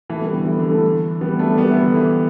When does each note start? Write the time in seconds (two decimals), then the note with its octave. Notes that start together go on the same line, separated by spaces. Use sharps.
0.09 E3 A3
0.21 G3 B3
0.34 D3
0.46 E3
0.59 D3 G3
0.71 E3 A3
1.21 G3 B3
1.39 A3 D4
1.57 G3 B3
1.70 E3
1.83 D3
1.95 E3